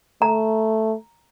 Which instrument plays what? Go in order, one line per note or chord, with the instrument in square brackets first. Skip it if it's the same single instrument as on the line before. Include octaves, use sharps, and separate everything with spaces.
[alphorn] A3 [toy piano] A#5